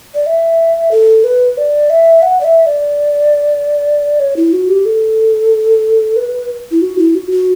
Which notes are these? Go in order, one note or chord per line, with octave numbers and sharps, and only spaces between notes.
D5
E5
A4
B4
D5
E5
F#5
D5
E5
D5
C#5
E4
F#4
G4
A4
B4
E4
F#4
E4
F#4
F#4